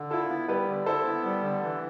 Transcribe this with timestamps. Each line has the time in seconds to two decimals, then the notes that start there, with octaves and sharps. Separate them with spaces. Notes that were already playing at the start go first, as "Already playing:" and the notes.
Already playing: D3
0.10 E4 F4 A4
0.29 B3
0.48 G3 G4 B4
0.68 D3
0.86 E4 A4 C5
1.06 B3
1.24 G3
1.43 D3
1.63 E3